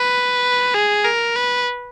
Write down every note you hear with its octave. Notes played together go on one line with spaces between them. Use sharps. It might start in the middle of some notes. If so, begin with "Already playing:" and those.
Already playing: B4
G#4
A#4
B4